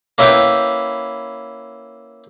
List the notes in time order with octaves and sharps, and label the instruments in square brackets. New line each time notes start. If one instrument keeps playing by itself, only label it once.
[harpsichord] A#3 C#4 E4 B4 C#5 G5